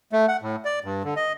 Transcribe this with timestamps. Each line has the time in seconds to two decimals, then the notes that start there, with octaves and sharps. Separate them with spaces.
0.12 A3
0.28 F#5
0.42 A2
0.65 D5
0.84 G2
1.04 D3
1.16 D#5